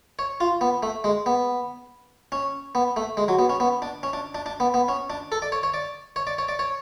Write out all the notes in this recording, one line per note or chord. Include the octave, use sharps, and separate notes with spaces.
C#5
F4
B3
A3
G#3
B3
C#4
B3
A3
G#3
F#3
B3
C#4
B3
D4
C#4
D4
D4
D4
B3
B3
C#4
D4
A4
D5
C#5
C#5
D5
C#5
D5
C#5
D5
C#5